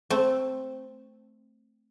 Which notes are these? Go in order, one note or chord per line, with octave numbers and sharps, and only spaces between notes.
A3 C4